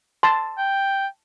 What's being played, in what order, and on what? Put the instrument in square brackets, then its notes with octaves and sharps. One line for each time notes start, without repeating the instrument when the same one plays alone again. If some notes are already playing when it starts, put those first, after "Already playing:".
[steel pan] A5 C6
[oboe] G5